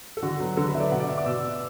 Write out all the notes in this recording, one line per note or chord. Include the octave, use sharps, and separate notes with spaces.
A4
D3 F#4
F#3 B3
D3 A4
B4
F#3 B3 E5
D5
B2 F#5
D5
B3 E5
D6
B2 E6
B3